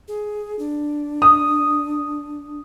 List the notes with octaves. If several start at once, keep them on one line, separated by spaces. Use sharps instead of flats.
G#4
D4
D#6